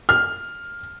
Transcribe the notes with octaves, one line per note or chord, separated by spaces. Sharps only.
F6